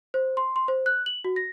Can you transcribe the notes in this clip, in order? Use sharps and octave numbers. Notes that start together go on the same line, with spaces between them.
C5
C6
C6
C5
F#6
F#7
F#4
A#6